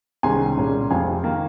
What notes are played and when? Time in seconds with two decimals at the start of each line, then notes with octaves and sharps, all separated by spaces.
0.23 C2 C3 D#3 G#3 C#4 G#5 C6
0.57 C2 A#2 G#3 C#4
0.90 F1 F2 C3 F5 G#5
1.24 D#3 A#3